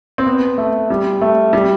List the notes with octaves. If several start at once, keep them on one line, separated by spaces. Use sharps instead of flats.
C4
B3
A3
G3
A3
G3